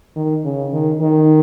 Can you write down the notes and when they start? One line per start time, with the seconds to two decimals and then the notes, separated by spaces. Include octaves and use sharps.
0.16 D#3
0.44 C#3
0.73 D#3
1.01 D#3